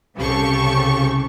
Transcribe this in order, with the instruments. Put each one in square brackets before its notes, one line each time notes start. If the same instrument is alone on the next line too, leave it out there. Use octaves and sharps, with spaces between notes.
[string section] C2 C#3 G4 A4 C#6